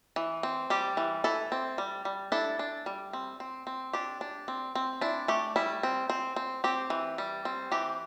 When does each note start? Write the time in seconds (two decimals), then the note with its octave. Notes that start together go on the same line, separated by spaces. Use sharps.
0.16 E3
0.43 C4
0.70 G3 G4
0.97 E3
1.24 E3 E4 A4
1.52 C4
1.78 G3
2.05 G3
2.32 D4 E4 A4
2.59 D4
2.86 G3
3.13 C4
3.40 C4
3.67 C4
3.93 D4 G4
4.21 D4
4.48 C4
4.75 C4
5.01 D4 E4
5.28 A3 G4
5.56 G3 E4
5.83 C4
6.10 C4
6.36 C4
6.64 C4 G4
6.90 E3
7.18 G3
7.45 C4
7.72 E3 G4